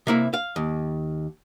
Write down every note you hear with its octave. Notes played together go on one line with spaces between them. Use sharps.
C3 A#3 E4
F5
D#2